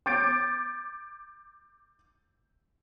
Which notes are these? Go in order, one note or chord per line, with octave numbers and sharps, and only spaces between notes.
D6 G6 A6 D7